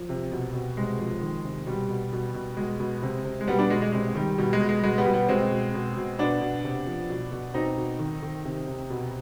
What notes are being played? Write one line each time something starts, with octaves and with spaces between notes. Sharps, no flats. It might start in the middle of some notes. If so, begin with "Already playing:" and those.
Already playing: F3
C3
B2
B2
C3 G#3
F3
D#3
C3
B2 G3
B2
B2
B2
B2 G#3
B2
C3
C3
G#3
B2 G3 B3
B3 D4
B2 G#3
G#3
C3 G#3
D#3 G3
B2 G3
G#3
B2
G#3
B2 G#3
G3 B3
B2
G3 B3
B2 G#3 C4
B2
B2
B2
B2 B3 D4
B2
C3
F3
B2
B2
B2 C4 D#4
B2
D#3
D#3
C3
C3
B2